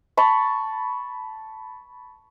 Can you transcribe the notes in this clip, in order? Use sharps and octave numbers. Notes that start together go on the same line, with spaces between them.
A5 B5 C#6